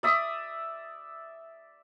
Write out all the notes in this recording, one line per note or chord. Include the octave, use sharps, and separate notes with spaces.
D5 E5 D#6